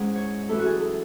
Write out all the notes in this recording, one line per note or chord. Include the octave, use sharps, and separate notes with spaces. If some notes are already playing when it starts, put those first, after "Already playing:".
Already playing: G#2 G#3 C#4 E4 F#5
C#5
F#2 E3 A3 E4 A4
F#4
G#4
A4